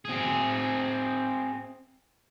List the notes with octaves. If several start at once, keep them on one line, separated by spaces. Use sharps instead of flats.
C4 G#4